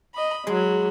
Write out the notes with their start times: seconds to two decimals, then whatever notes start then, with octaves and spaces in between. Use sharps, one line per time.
0.15 D#5 B5
0.47 F#3 G#3 B5